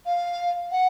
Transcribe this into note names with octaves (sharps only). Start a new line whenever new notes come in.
F5
F#5